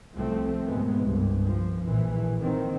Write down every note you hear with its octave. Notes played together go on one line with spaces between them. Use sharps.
C2 F3 A3 C4
D#2 G#2 B2 G#3 B3
C2 G2
F3
A#1 A#2 E3
A#2 D#3 C4